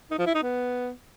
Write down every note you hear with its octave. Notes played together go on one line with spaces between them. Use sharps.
D#4
F3
E4
D#4
B3